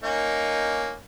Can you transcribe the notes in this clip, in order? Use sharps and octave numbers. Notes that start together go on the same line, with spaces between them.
A#3 C#4 D#4